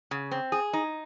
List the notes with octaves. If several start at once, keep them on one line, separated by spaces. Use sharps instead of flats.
C#3
C4
G#4
D#4